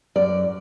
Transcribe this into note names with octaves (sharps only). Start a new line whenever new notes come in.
F#2 D5